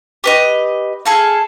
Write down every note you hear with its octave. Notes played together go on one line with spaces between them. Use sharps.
G4 B4 D#5
G#4 A4 F5